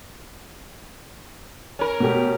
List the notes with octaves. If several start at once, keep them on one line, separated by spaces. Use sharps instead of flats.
C#4 A#4
B2 A3 G4